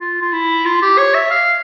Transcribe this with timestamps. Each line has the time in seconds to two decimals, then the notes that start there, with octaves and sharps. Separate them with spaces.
0.01 F4
0.22 F4
0.33 E4
0.66 F4
0.82 G4
0.98 C#5
1.14 E5
1.31 F5